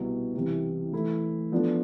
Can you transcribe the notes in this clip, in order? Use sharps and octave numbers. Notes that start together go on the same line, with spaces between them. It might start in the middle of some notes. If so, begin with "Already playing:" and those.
Already playing: C2 B2 B3
C2 C3 E3
E3 A3 E4 A4
F3 B3 D4 A4